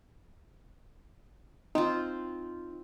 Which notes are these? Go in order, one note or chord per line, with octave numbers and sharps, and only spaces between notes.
C4 D#4 F4